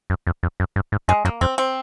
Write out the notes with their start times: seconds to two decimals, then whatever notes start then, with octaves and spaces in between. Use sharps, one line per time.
0.10 F#2
0.27 F2
0.43 F2
0.60 F#2
0.76 G2
0.92 G#2
1.08 F#2 G#3
1.25 F#2 A#3
1.41 F2 C4
1.58 C4